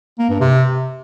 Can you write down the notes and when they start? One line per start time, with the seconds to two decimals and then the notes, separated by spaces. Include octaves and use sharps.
0.19 A#3
0.29 G2
0.40 C3